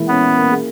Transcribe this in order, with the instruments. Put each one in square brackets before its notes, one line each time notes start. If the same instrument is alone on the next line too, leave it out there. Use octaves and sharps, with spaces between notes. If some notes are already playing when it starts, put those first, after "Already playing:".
Already playing: [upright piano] E3 G#3 A#3 E4
[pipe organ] B3 [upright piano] C#4
[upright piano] E4
A#3
G#4